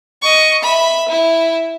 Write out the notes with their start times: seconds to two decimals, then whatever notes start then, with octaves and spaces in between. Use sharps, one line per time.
0.22 D#5 C#6
0.63 E5 B5
1.08 E4